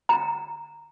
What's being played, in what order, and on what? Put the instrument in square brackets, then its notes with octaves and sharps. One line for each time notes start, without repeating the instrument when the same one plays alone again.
[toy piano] A#5